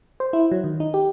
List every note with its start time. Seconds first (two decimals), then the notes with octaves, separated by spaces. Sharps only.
0.20 C5
0.33 E4
0.51 F#3
0.64 D#3
0.80 D#4
0.94 G4